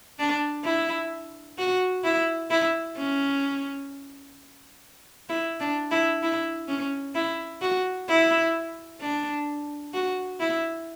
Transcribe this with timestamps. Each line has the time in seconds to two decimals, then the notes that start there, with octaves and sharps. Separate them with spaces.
0.19 D4
0.65 E4
1.58 F#4
2.04 E4
2.50 E4
2.97 C#4
5.29 E4
5.60 D4
5.91 E4
6.23 E4
6.68 C#4
7.15 E4
7.61 F#4
8.09 E4
9.00 D4
9.94 F#4
10.40 E4